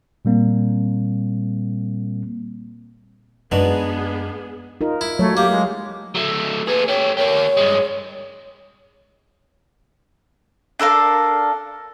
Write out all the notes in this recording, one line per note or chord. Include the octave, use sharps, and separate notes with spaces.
A#2 G3 A#3 C4
F#2 G#3 B3 D4 D#4 F#4 G#4 B4
D#4 F4 A#4
E4
F#3 A3 C#5
A#3 G4
G#3
F#3 A3
A#3 G#4 B4
A3 G4 C#5
A#3 G4 C#5
G2 G#3
D4 A4 A#4 F5